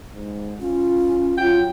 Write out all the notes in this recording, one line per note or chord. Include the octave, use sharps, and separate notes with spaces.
G#2
C#4 F4
F#3 F4 G5